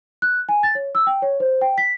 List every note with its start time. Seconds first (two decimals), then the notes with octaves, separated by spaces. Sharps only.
0.22 F#6
0.49 G#5
0.63 A6
0.75 C#5
0.95 E6
1.07 G5
1.22 C#5
1.40 C5
1.61 G5
1.78 B6